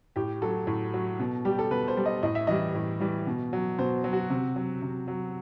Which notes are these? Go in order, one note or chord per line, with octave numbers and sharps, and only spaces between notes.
A2 G4
F#3 A4
A2
F#3
B2
G3 G4
A4
B2 B4
C5
G3
D#5
A2 D#5
E5
E3 G3 D#5
A2
E3 G3
B2
F#3
B2 C5
F#3
F#4
C3
F#3
C3
F#3